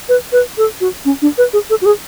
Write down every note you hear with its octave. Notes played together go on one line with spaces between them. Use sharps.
B4
B4
A4
F#4
C#4
D4
B4
G#4
A4
F#4
G#4